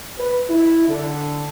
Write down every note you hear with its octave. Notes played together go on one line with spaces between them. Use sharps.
B4
E4
D3